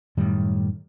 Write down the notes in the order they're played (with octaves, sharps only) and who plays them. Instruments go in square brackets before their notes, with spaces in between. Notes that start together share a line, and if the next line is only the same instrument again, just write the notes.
[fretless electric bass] F#2 A2 D#3 G3